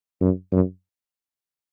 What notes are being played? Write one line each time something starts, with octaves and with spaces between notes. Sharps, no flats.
F#2
F#2